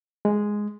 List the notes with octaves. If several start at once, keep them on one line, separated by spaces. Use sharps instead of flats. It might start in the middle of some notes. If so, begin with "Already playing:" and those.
G#3